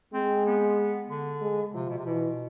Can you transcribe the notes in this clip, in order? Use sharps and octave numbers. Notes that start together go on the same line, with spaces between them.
G#3 C4
B3
D3
G#3
C3 F3
B2
C3
B2 E3